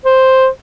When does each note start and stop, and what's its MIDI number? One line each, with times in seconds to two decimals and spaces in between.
0.06 0.47 72